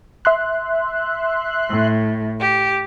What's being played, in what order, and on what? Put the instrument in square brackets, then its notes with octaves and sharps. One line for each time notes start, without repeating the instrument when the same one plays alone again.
[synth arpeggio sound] E5 C6 F#6
[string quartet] A2
G4